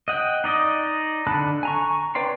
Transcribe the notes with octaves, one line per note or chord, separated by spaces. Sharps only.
D#5 F#5 G5
D#4 D5 D#5
D3 A5 B5 F#6
G#5 A#5 C#6
B4 C#5 D5 G5 C6